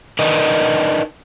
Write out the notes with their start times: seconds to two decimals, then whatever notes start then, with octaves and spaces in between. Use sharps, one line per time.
0.19 D4 D#4 A#4 B4 D#5